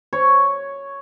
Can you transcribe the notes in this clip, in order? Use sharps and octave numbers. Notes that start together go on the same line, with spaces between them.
C#5